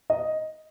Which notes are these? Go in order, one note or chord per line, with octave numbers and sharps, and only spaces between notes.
D#5